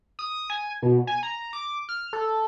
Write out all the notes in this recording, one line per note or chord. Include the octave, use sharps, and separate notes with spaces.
D#6
G#5
B2
G#5
A#5
D6
F6
A4